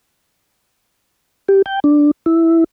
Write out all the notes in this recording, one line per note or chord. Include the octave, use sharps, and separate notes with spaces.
G4
G5
D4
E4